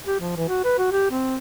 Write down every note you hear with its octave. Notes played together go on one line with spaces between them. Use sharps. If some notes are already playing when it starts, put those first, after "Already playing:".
G4
F3
E3
F#4
B4
F#4
G4
C4